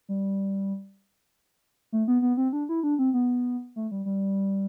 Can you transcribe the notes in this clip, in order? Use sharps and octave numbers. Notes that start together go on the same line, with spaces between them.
G3
A3
B3
B3
C4
D4
E4
D4
C4
B3
A3
G3
G3